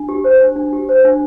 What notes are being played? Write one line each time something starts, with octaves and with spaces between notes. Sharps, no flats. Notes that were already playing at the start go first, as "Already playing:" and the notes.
Already playing: D4
G4
C5
D4
D4
G4
C5
D4